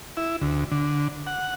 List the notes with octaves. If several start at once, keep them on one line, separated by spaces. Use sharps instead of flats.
E4
D2
D3
F#5